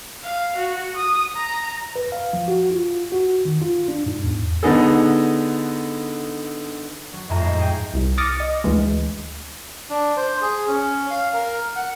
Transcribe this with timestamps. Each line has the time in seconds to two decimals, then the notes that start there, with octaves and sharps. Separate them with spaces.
0.24 F5
0.57 F#4
0.96 D#6
1.36 A#5
1.96 B4
2.12 F5
2.33 F3
2.48 F#4
2.71 F4
3.12 F#4
3.45 D#3
3.62 F4
3.88 D4
4.06 G#2
4.24 E2
4.63 D3 B3 D#4 G#4 A4
7.13 F#3
7.29 F2 A2 G#4 G#5 A#5 E7
7.42 G#2 G#3 C7
7.59 G#4 G5
7.94 C2
8.18 D6 D#6 F6 A6 A#6 C#7
8.40 D#5
8.64 D2 E3 G#3
9.90 D4
10.17 C5
10.41 G#4
10.68 C#4
11.10 F5
11.34 A#4
11.76 F#5